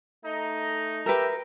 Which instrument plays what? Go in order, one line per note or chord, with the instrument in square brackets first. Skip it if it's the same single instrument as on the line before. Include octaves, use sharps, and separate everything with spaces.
[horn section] A3 D#4
[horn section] G4 E5 G5 [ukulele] A#4 B4